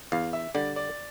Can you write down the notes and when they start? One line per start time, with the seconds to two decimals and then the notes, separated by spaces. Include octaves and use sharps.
0.12 E2 F5
0.33 E5
0.54 D3 G3 D4 G4 D5
0.76 D5